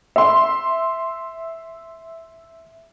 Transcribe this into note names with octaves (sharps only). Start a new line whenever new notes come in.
E5 C6